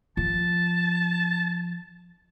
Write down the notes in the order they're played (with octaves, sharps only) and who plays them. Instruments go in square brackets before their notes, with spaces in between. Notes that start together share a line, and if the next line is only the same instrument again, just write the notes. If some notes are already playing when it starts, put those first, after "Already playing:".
[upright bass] F3 [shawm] A5